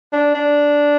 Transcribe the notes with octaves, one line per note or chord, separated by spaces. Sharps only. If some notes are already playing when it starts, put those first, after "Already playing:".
D4
D4